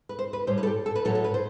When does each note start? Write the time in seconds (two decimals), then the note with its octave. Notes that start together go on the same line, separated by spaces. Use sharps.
0.09 B4
0.19 C5
0.33 B4
0.47 A2 G3 C5
0.58 B4
0.63 A4
0.67 G4
0.86 A4
0.95 B4
1.05 A2 F#3 A4
1.15 A4
1.24 B4
1.34 C5